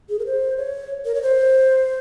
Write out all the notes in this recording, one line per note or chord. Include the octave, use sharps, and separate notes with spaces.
G#4
A#4
C5
C#5
A#4
C#5
C5